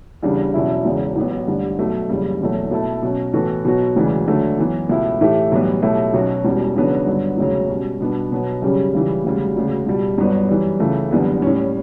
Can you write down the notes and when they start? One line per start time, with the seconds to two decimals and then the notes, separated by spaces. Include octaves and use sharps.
0.23 E2 C#3 G3 D4
0.54 E2 B2 F#3 C#4 E4
0.85 E1 E2 C#3 F#3
1.16 A1 A2 F#3 B3
1.47 A1 G2 D3 G3
1.79 B1 B2 A3
2.09 F#1 E2 C#3 G3
2.41 F#1 E2 B2 F#3 A3
2.71 B2 A3 E4 A4
3.03 B2 F#3 C#4
3.33 A2 E3 B3 F#4 A4
3.65 B2 F#3 B3 F#4
3.96 E1 D2 C#3 E3
4.27 D2 D3 F#3 A3
4.59 F#2 E3 B3
4.89 C#2 B2 A3 E4
5.21 A2 E3 A3 E4 G4
5.52 B1 A2 E3 G3 B3
5.82 B2 F#3 A3 E4 G4
6.13 B1 B2 F#3 C#4 F#4
6.44 E1 E2 B2 G3 C#4
6.76 E2 C#3 F#3 B3 D4
7.07 G2 D3 F#3 B3
7.37 E1 D2 C#3 F#3
7.69 B2 G3 C#4
8.00 B2 G3 B3 D4 G4
8.32 B2 F#3 B3
8.62 F#2 C#3 G3 C#4 G4
8.94 C#2 C#3 E3 G3
9.24 E1 D2 C#3 G3
9.56 E1 D2 C#3
9.87 C#2 B2 G3
10.18 G1 G2 F#3 B3
10.49 F#2 E3 G3
10.80 C#2 C#3 E3 A3
11.11 F#1 E2 D3 G3 B3
11.42 A2 G3 C#4